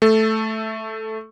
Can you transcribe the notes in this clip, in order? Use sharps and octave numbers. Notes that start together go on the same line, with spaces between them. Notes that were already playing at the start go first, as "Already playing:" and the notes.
A3 A4